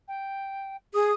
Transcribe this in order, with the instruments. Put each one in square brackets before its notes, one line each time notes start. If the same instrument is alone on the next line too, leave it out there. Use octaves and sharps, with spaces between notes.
[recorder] G5
[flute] G#4 [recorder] D#6